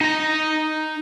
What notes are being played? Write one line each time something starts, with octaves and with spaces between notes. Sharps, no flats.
D#4 A#5